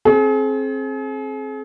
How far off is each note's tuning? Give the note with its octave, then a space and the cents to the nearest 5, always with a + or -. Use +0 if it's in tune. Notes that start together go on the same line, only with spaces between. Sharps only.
C4 +25 G#4 +40